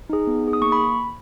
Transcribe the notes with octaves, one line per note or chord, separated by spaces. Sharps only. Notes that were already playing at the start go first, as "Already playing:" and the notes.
D#4 G#4
B3
D#4 G#4
D#6
A#3 C#6
B5